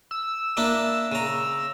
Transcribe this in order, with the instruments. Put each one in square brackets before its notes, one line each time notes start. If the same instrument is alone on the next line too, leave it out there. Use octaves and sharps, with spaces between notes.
[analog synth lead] E6
[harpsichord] A#3 D4 E4
C#3 A#5